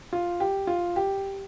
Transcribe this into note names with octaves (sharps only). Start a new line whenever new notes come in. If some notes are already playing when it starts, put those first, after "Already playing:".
F4
G4
F4
G4